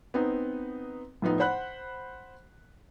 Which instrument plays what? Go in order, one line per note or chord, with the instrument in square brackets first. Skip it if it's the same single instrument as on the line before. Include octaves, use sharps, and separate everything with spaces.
[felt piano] B3 C4 D#4
A2 F3 B3 D#4 E4
C5 F#5 B5 F#6